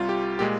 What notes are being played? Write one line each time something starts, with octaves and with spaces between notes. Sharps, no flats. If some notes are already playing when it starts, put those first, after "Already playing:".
Already playing: C2 C3 G3 F4
G4
A#2 G#3 G4